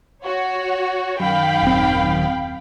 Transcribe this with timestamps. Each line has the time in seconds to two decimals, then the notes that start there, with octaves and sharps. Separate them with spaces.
0.24 F#4 C#5
1.20 F#2 D#3 F5 G5 B5
1.63 D#1 C4